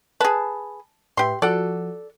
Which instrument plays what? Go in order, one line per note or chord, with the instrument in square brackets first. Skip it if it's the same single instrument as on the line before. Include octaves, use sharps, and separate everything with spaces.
[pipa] G#4 B4 [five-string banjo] A5
[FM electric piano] A2 B4 E5 [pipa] G4 C6
[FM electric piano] F3 F#4 [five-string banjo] A4 [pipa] D5 F#5